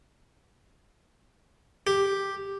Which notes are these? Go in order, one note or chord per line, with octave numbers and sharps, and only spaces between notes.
G4